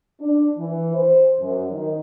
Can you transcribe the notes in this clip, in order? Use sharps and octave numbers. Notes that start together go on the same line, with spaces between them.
D4
E3
C5
F#2
D#3